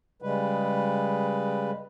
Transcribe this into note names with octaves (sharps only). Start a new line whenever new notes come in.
C#3 G3 G#3 B4